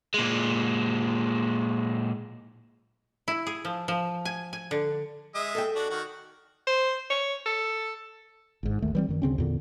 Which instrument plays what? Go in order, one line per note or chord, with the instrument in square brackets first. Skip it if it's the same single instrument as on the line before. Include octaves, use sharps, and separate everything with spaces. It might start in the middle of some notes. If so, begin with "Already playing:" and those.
[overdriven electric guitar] A#2 G#3
[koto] E4
G#4
F3
F3
G#5
G#5
D3
[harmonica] G#3 E5 D#6
[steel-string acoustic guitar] A4 D#5 G5
[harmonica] D4 F#4
D#3 F#4
[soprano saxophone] C5
C#5
A4
[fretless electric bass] G#1 G#2
D#1 D#3 A3
E3 G3 C4
F#2 D#3
D2 C#3 C4 C#4
E2 A#2 D3